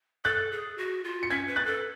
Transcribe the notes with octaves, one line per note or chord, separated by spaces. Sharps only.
A4 F#6 A6
G#4
F#4
F4
C#7
C#4 G#6 B6
B4
F#6 A6
A4